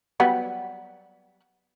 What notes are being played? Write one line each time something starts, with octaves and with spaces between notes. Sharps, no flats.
F#3 G3 B3